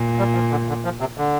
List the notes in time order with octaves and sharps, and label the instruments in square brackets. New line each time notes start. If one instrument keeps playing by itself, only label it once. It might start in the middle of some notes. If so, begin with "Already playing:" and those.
Already playing: [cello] A#2
[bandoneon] G3
F3
D3
D3
F3
C3
D3